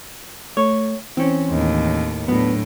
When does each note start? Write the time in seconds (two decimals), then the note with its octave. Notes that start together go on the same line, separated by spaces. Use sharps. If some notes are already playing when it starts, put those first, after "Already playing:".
0.57 A3 C#5
1.17 E3 C4 C#4
1.50 D#2 A2
2.28 A2 F#3 B3 D4